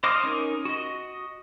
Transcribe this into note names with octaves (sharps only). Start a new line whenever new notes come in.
C5 D#5 D6 F6
C#4 D#4 A#4
F#4 D#5